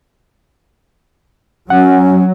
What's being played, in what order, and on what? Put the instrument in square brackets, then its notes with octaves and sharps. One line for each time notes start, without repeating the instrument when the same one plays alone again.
[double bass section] F#3 [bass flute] C#4 [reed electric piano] F#5